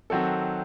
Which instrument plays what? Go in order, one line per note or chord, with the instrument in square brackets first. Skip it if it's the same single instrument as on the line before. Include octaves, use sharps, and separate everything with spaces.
[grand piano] D#3 F#3 C4 F#4 A4